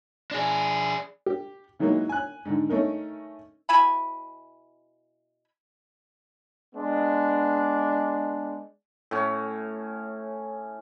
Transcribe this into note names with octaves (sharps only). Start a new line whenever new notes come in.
D4 G#4
G4
D#3 E3 F#3 G#3 A#3 D#4
G#5 F#6
G#2 D3 D#3
A3 C#4 D#4 A#4
B2 E4 G#5 B5
G#3 B3 D4
A2 C#4